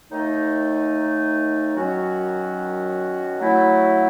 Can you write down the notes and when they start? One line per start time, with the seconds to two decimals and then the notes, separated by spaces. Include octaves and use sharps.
0.11 D#2 D#3 A3 D#4
1.74 F#2 D#3 F#3 C#4 F#4
3.39 F#3 A3 E4